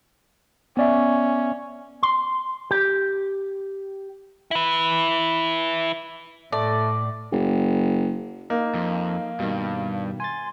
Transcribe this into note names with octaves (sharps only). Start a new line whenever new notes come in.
B3 C#4 D5 E5
C6
G4
E4 B4
A2 A3 D5
F#1
A#3 D#4 F5
F2
G2 B2 D#3
G#5 C6 A6